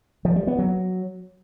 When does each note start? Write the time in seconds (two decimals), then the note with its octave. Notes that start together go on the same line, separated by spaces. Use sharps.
0.25 F3
0.36 G3
0.47 B3
0.59 F#3